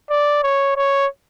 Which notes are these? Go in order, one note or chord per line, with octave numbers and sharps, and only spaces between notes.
D5
C#5
C#5